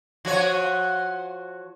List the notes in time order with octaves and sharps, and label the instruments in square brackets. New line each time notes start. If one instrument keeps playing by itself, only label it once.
[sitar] F3 F#4 C#5